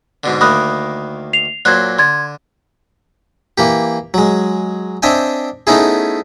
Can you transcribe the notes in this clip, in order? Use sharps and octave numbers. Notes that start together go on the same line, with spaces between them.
G#2 B2 D3
D2 D#3 A#3 B5 D#6 F#6
C7 F7
A#2 F#3 C5 F#6 G#6
D3 C6 G#6 A6
E3 A#3 G4
F#3 G#3
C4 D4 D#5 E5 G5 G#5
A3 B3 C#4 D#4 E4 G#4